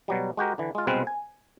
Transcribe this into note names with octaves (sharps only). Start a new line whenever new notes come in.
B2 F#3 G3
G#3 F#4 G4 A#4
D3 E3
G#3 F4
C2 B2 G#3 C4 B4 F5
G#5